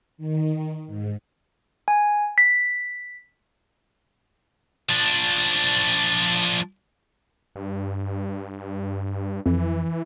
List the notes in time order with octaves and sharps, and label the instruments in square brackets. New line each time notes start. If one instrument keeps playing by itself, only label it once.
[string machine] D#3
G#2
[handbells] G#5
B6
[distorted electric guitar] F3 D4
[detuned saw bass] G2
[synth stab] F2 [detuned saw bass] E3